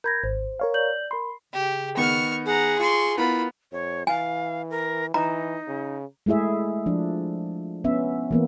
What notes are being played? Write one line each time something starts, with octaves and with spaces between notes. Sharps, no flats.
A#4 B5 G6 G#6 A#6
G#1 C5
A#4 C#5 F5
D5 G6 F#7
A#4 B5 C6
C#3 G4
D#3 B3 C#6 F6
G#4 F#5 A#5
F4 C6 C#6
B3 E4 F4 A#4 B5
F2 C#5
E3 F5 G#5
A#4
E3 D#4 A#5
C#3
G#3 A3 E4 G#4 E5
F3 D4
B3 C#4 E5
E3 A#3 B3